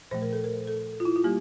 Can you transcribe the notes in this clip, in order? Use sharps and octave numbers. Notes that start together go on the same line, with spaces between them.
A#2 F3 A3 C5
A#4
A4
A#4
A4
F4
E4
F4
G3 A#3 G4